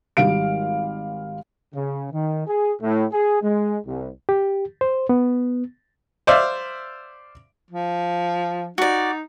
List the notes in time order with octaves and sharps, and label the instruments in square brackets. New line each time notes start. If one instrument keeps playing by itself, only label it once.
[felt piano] G#1 G3 F5 D7
[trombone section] C#3
D#3
G#4
A2
G#4
G#3
C2
[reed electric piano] G4
C5
B3
[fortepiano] C5 D5 E5 F5
[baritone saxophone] F3
[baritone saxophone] D#4 [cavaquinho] F#4 D5